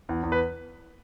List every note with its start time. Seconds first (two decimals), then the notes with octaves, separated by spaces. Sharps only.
0.09 E2
0.23 E2
0.32 B4